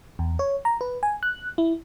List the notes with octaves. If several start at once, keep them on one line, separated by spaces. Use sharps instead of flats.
E2
C#5
A#5
B4
G#5
F#6
E4